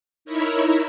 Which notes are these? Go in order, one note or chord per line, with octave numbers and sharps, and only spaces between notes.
D#4 E4 A#4 C#5 E5 B5